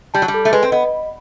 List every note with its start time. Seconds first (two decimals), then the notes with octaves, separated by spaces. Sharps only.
0.14 G3 A5
0.22 F#3
0.28 G3
0.34 A4
0.45 A3
0.52 G#3 B4
0.63 C4
0.72 B3 D#5